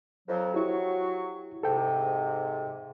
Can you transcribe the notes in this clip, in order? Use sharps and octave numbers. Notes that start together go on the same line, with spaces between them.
F2 F3 F#3
F#3 E4 G4 C#6
G#2 C3 A4 G5